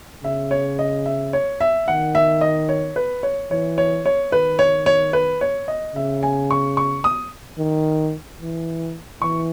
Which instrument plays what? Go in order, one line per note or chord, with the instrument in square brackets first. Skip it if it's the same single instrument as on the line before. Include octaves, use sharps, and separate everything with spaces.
[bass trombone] C#3 [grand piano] E5
[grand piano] C#5
D#5
E5
C#5
E5
[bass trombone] D#3 [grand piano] F#5
[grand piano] E5
D#5
C#5
B4
C#5
[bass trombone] E3 [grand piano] C#5
[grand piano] C#5
C#5
[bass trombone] D#3 [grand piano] B4
[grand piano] C#5
C#5
B4
C#5
D#5
[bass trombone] C#3 [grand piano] E5
[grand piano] G#5
C#6
C#6
D#6
[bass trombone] D#3
E3
[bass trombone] E3 [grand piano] C#6